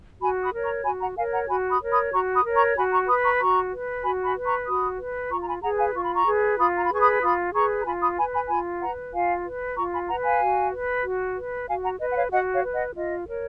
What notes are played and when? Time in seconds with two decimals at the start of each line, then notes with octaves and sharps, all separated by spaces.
0.21 F#4 G#5 B5
0.43 B5 D#6
0.54 A#4 C#5
0.64 A#5 C#6
0.85 F#4 G#5 B5
1.01 F#5 A#5
1.17 A#4 C#5 F5 G#5
1.32 F#5 A#5
1.49 F#4 G#5 B5
1.70 B5 D#6
1.81 A#4 C#5
1.91 B5 D#6
2.12 F#4 A#5 C#6
2.34 B5 D#6
2.44 A#4 C#5
2.55 A#5 C#6
2.76 F#4 G#5 B5
2.92 A#5 C#6
3.08 B4 B5 D#6
3.24 A#5 C#6
3.40 F#4 A#5 C#6
3.72 B4
4.03 F#4 G#5 B5
4.25 G#5 B5
4.36 B4
4.46 A#5 C#6
4.67 F#4 B5 D#6
4.99 B4
5.30 F4 A#5 C#6
5.41 A#5
5.47 G#5 B5
5.63 G#4 F#5 A#5
5.67 B4
5.79 F5 G#5
5.95 F4 C#6
6.04 B5
6.14 A#5 C#6
6.27 G#4 B4
6.59 F4 B5 D#6
6.77 A#5
6.84 B5
6.90 G#4 B4 C#6
7.01 B5 D#6
7.22 F4 B5 D#6
7.54 G#4 B4 A#5 C#6
7.81 A#5
7.86 F4 G#5 B5
8.02 B5 D#6
8.18 B4 G#5 B5
8.34 G#5 B5
8.49 F4 G#5 B5
8.81 B4 F#5 A#5
9.13 F4 F5 G#5
9.45 B4
9.77 F4 A#5 C#6
9.93 G#5 B5
10.08 B4 F#5 A#5
10.24 F5 G#5
10.40 F#4
10.72 B4
11.04 F#4
11.37 B4
11.68 F#4 F5 G#5
11.83 F#5 A#5
12.00 B4 D#5
12.11 F#5
12.16 C#5 F5
12.31 F#4 D#5 F#5
12.53 C#5 F5
12.64 B4
12.74 D#5 F#5
12.95 F4 D#5
13.27 A#4 C#5